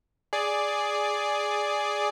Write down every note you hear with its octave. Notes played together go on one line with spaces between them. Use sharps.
G#4 D5